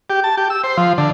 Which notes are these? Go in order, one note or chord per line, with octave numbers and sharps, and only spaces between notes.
G4
A5
G4
E6
C5
F3
D3